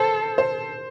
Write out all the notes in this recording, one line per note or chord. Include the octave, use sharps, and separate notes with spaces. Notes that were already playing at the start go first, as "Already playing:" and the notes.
Already playing: A4 C5
C5